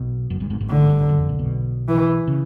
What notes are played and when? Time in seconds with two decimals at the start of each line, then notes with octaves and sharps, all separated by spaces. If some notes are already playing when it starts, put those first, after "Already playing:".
Already playing: B1 B2
0.30 F#1 F#2
0.40 G1 G2
0.50 G#1 G#2
0.61 G#1 G#2
0.70 A1 A2 D3
0.89 G1 G2
1.09 F#1 F#2
1.19 F2
1.29 A#1 A#2
1.39 B1 B2
1.88 E3
2.27 C#3